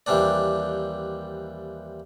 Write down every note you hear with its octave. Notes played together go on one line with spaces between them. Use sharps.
D#2 E3 G3 C4 D4 D5